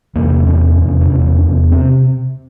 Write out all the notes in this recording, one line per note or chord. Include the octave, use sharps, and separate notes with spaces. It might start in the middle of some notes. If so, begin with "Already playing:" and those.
E2 C3 A#3
E2 C3 C#4
E2 C3
D4
E2 C3 C#4
E2 C3
C3 C4